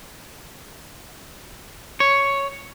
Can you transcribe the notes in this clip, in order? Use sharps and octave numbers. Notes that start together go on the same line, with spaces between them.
C#5